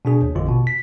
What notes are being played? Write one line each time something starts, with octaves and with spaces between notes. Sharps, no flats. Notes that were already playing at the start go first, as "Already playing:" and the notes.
B2 D4 G#4
D#2
A1 F2 D3 F4
B2
B6